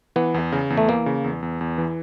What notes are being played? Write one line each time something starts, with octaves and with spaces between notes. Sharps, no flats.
E3 B3
E2
C#3
E2
A3
E3 A#3
C#3
E2
E2
E2
E3